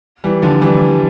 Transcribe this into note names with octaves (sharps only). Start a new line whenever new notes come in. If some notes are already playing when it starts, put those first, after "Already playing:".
E3 G3
D3 F3
E3 G3